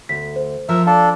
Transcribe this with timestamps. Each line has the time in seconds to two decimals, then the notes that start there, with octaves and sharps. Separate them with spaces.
0.09 D2 B6
0.36 C5
0.69 F3 A#4 E5
0.87 D4 A4 F5